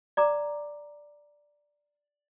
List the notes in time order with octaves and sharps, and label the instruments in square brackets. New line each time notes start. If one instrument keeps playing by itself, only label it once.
[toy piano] D5 A#5 D6